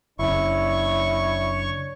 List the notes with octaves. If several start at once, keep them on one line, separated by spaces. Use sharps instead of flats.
F#1 C#3 D4 E4 C#5 C#6